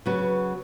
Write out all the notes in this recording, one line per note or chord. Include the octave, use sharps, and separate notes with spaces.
C#3 F#3 B3